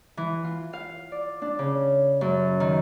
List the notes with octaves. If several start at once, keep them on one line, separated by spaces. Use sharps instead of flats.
E3
F4
F5
D5
D4
C#3
F#2
D#3